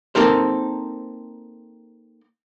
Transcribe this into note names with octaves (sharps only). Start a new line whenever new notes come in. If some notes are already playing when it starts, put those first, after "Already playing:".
A#3 C4 D#4 A4 A#4 C5